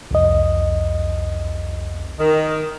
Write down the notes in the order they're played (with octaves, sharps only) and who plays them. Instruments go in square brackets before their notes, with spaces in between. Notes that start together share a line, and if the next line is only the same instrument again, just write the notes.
[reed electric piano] C2 F2 D#5
[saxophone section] D#3